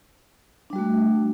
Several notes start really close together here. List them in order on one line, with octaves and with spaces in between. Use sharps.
D4 G3 F#4 A3